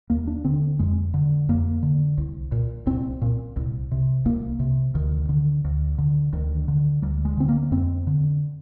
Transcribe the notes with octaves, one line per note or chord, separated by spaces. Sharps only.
D#2 A#3
D4
D3 C4
F2 G#3
D3
F2 A#3
D3
C2
A#2
C2 C4
A#2
C2
C3
C2 A#3
C3
D2 D#3
D3
D2
D3
D2 D#3
D3
D2 G3
G#3
D3 C4
A#3
F2 C4
D3